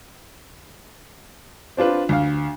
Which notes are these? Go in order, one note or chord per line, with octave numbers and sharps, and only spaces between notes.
C4 D4 F4 B4
D2 F5